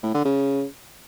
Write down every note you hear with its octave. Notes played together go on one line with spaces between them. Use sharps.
A2
D3
C#3